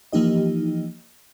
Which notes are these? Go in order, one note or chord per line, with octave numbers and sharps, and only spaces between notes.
E3 F3 A#3 D#4 G4 D#5